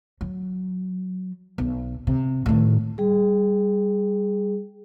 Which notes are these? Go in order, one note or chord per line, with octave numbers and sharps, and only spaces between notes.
F#3
B1
C3
A2 D#3
G3 G#4